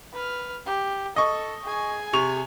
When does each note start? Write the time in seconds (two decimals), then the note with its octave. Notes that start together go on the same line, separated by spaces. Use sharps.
0.14 B4 F6
0.66 G4
1.16 A4 D#5 C#6
1.64 G#4 G#5
2.13 C3 C#6 F7